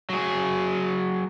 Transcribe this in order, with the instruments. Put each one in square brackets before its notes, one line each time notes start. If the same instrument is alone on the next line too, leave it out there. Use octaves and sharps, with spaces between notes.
[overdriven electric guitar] F#3 G#4